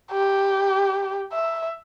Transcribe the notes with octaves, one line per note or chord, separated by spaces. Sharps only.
G4
E5